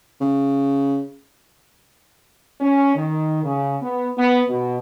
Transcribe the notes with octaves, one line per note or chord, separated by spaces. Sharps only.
C#3
C#4
D#3
C#3
B3
B3
B2